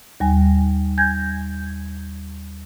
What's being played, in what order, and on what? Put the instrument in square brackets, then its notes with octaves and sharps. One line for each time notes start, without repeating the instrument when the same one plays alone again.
[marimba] D#2 G3 G#5
G#5 G6 G#6 A#6